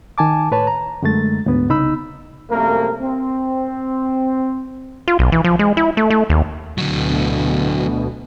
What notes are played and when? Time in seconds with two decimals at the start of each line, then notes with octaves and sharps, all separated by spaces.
0.18 D#3 G#5 A5 D6
0.51 A2 B4 C#5 A5
0.67 A#5
1.02 F#2 D3 G#3 A3 A6
1.46 D2 G#2 B3
1.69 C2 C#3 D#4 B5 E6
2.50 C2 F#2 C3 A3 A#3 A#4
3.00 C4
5.08 F4
5.19 B1
5.32 E3
5.44 F3
5.59 G#3
5.77 E4
5.97 A3
6.10 A3
6.30 D#2
6.78 D2 B2 D3 F#3